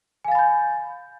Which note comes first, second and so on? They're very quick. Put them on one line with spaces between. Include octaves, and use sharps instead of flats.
G#5 F5 A6 B5 G6